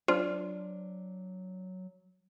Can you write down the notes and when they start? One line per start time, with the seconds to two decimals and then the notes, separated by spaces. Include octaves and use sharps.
0.08 F#3 D4 F4 C5